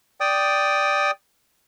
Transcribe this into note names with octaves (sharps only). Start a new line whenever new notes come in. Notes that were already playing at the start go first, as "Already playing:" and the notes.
D5 G5 D#6